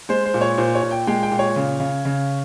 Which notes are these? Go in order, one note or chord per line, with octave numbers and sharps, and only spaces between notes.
G#3 C5
C5
A#2
C#5
A#2 C5
C#5
A#2
G5
G#3 G5
G5
A#2
C#5
C#3
C#3
C#3